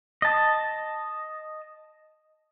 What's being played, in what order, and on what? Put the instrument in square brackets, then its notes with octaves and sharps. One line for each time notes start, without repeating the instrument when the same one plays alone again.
[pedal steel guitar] D#5 A5